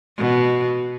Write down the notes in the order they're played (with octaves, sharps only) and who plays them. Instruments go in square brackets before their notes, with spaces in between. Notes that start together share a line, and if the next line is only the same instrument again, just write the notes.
[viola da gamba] B2